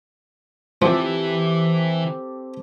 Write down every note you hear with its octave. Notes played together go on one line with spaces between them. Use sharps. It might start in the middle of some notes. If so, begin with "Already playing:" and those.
E3 F3 C4 E4 G4 A4